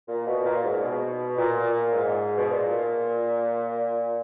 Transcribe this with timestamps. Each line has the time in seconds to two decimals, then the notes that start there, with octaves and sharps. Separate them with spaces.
0.08 A#2
0.27 B2
0.45 A#2
0.63 G#2
0.83 B2
1.38 A#2
1.93 G#2
2.37 B2
2.48 A#2